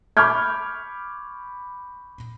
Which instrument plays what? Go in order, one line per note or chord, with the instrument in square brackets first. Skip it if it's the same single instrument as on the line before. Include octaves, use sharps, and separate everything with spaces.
[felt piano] B5 C#6 D6 F6 G6 G#6